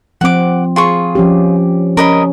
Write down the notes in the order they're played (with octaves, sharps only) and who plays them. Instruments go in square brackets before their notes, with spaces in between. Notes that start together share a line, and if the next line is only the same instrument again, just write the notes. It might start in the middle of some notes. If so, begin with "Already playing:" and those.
[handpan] F3 C4 [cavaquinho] F#5 D6
[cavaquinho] F4 G#4 C#6
[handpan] F3 C#4 G4
[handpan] C#4 [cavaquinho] A#4 D#5 B5